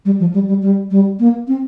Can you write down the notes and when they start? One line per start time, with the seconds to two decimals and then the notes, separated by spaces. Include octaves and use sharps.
0.05 G3
0.20 F3
0.34 G3
0.48 G3
0.62 G3
0.91 G3
1.20 A#3
1.48 C4